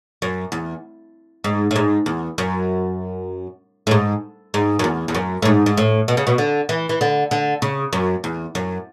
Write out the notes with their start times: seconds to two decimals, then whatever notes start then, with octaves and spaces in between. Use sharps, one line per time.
0.22 F#2
0.52 E2
1.44 G#2
1.71 A2
1.76 G#2
2.06 E2
2.38 F#2
3.87 A2
3.91 G#2
4.54 G#2
4.79 F#2
4.84 E2
5.08 E2
5.15 F#2
5.42 A2
5.45 G#2
5.66 G#2
5.77 A2
6.08 B2
6.17 C#3
6.27 B2
6.38 D3
6.69 E3
6.89 E3
7.01 D3
7.31 D3
7.62 C#3
7.93 F#2
8.24 E2
8.55 F#2